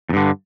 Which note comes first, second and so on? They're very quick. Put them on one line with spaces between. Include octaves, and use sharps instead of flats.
E2 G2 D3